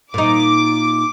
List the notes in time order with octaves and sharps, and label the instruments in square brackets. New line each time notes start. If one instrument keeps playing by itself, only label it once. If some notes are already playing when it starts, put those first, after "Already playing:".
[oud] A#2 D#4 [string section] D6